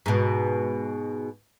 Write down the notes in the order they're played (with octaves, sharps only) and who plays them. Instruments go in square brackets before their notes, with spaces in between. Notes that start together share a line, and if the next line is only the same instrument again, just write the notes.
[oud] G#2 B2